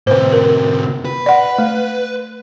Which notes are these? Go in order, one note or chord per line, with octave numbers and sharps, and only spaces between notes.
A2 C3 B4 C5
A#4
B4
D5 F#5
A3